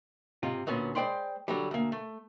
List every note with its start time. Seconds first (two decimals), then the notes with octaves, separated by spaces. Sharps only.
0.43 G#2 C3 F4
0.67 D2 A#2 B3 C#4
0.95 G#3 C5 D5 G5 B5 C6
1.48 D3 F#3 G3
1.71 D2 A#3
1.92 A3